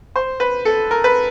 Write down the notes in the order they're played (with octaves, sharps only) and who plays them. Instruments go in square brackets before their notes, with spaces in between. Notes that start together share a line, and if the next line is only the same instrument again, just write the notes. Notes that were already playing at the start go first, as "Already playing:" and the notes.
[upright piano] C5
B4
A4
A#4
B4